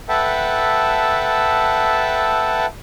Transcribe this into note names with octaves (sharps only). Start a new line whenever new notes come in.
A4 B4 E5 F#5 G5 A5